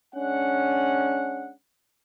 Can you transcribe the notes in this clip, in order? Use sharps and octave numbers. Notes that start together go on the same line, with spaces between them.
G#3 C#4 D4 F#5